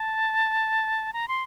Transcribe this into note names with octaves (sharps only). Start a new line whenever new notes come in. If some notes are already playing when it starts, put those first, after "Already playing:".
Already playing: A5
A#5
C6